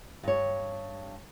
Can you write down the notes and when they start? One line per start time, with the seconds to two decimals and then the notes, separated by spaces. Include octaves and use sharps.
0.23 G2 C#5